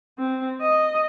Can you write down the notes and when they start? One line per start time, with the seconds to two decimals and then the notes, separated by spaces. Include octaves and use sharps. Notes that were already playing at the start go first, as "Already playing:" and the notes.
0.18 C4
0.61 D#5